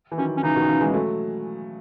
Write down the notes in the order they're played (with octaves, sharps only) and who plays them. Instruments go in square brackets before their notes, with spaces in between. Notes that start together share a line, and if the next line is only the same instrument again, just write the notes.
[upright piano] E3
[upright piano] D#3 F#3 [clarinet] C#4
[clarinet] C#4
[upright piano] C#3 E3 [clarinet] D#4
[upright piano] B2 D#3
C#3 E3
E3 G#3
F#3 A3